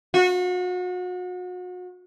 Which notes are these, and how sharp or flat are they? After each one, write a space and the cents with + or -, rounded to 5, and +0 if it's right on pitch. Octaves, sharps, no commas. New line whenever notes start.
F#4 -35